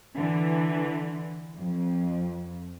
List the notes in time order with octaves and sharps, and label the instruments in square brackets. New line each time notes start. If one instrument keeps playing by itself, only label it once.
[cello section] D3 E3
F2